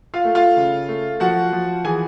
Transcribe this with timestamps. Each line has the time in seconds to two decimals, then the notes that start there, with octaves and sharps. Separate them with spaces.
0.14 F4 F5
0.25 A3
0.35 F4 F5
0.57 C#3
0.88 A3
1.20 F3 F#4 F#5
1.52 F3
1.84 E3 G#4 G#5